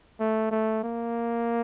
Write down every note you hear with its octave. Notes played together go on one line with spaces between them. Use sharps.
A3
A3
A#3